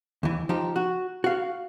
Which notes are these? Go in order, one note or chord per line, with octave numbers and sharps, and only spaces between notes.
D#2 E3
F3 D#4 G4
F#4
F#4 F5